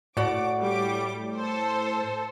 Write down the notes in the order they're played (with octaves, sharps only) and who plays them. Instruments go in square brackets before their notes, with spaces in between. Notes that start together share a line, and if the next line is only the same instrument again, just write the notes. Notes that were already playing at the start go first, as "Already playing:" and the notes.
[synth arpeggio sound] A2 [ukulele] F#4 D5 F#5 [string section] D6
[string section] G3 D6
A4 C5